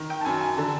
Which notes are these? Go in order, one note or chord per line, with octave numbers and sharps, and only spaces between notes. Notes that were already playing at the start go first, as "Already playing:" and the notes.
Already playing: D#3
G5
A5
F#2 G#5
G#5
D3 A5